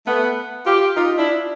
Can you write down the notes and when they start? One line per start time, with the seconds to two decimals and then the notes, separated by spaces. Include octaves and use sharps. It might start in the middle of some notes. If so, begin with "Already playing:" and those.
0.07 A3 B3
0.66 F4 G4
0.96 D#4 F4
1.18 D4 E4